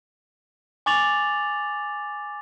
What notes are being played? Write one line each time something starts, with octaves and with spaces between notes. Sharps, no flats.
G#5 C#6 D6 A6 F7 F#7